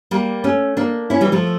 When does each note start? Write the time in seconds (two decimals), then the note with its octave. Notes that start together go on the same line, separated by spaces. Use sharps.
0.11 G3 A#3
0.44 A3 C#4
0.77 A#3 D4
1.10 C#4 E4
1.21 E3 G3
1.32 F3 A3